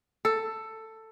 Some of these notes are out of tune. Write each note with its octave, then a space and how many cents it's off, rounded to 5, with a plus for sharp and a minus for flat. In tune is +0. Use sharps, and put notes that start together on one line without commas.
A4 +10